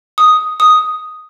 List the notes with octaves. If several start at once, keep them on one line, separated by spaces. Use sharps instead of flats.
D#6
D#6